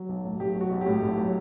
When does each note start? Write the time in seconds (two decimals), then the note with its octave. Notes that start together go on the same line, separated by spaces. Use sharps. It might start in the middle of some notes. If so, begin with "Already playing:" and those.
Already playing: F#3
0.09 B1
0.25 A2
0.40 B1 G4
0.55 F#3
0.61 F#4
0.71 B1
0.81 G4
0.86 A2
1.02 B1
1.17 F#3